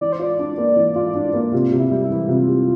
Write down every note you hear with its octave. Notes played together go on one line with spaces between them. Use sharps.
E3 D5
C5
F4 D5
D4
A#3
E3
F4
D4
A#3
C3 F4
C3
E4
G3
E4
E3
C3 F4
C3